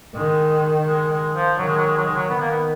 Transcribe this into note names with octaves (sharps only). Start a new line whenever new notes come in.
D#3 G#3
G#3
G#3
F3
D#3 F#3
G#3
F#3
G#3
F#3
G#3
F#3
D#3 B3
A#3
B3